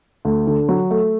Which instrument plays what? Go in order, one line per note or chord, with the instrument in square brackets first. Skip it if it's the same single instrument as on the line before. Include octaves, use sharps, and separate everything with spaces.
[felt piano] D2
D3
F#3
A3